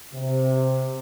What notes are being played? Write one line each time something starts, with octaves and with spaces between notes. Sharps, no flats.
C3